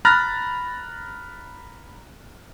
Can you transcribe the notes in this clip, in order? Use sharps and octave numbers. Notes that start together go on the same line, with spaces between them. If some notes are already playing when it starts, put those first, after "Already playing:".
A#5 B5 F6 F#6 A6 A#6